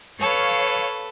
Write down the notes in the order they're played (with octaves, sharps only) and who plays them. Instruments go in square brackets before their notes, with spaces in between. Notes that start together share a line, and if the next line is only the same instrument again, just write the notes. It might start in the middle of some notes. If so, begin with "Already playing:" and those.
[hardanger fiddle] A4 B4 [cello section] C#5 F5